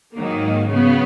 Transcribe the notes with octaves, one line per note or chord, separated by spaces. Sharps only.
G#2 D#3 F#3 A#3
C#3 F#3 B3